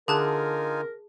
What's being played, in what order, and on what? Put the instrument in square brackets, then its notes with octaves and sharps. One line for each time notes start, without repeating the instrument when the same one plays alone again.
[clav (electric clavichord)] D3 [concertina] D#4 F4 G#5 [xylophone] G#4 A5 F#6 [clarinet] A#4